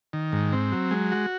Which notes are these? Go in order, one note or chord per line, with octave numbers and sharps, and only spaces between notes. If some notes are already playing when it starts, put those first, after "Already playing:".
D#3
G#2
C4
F#3
G#3
F#4